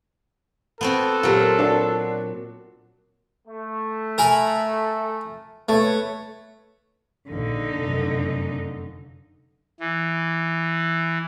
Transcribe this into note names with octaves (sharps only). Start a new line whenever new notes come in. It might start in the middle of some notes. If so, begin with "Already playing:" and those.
B3 C4 F#4 A4
A#2 F#3 F4 G4 A#4
D4 F#4
A3
A#4 G#5 B5
A3 B4 C#5
A#1 D3 D#4
F1 F#2
E3